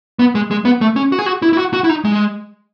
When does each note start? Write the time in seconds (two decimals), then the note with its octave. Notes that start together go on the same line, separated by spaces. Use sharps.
0.19 B3
0.35 G#3
0.51 G#3
0.65 B3
0.81 A3
0.96 C#4
1.12 F#4
1.19 G#4
1.26 F#4
1.42 E4
1.53 E4
1.58 F#4
1.73 F#4
1.84 E4
1.89 D#4
2.04 G#3